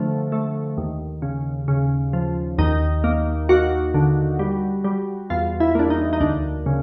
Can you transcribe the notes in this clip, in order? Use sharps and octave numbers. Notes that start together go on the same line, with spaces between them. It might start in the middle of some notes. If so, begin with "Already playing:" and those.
Already playing: D3 F3 A3
A3
D#2
C#3
C#3
F3
D#2 D#4
A#3
A#3 F#4
D3
G3
G3
E2 F4
E4
A#3 D4
D#4
D#4
D2 D4
C#3